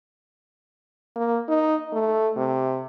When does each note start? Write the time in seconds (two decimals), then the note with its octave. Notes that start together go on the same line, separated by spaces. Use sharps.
1.16 A#3
1.48 D#4
1.93 A3
2.36 C3